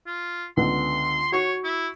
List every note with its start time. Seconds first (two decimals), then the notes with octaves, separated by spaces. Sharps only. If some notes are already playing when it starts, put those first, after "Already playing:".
0.07 F4
0.57 C#2 D3 B3 C6
1.32 F#4 C#5 C#6 C7
1.64 E4